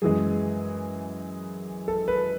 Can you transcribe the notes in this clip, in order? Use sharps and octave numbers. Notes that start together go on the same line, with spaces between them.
F#2 E3 G#3 G#4
A4
B4